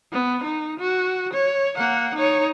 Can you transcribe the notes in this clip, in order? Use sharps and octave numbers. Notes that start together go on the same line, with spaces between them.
B3
D#4
F#4
C#5
A#3 F#5
D#4 C#5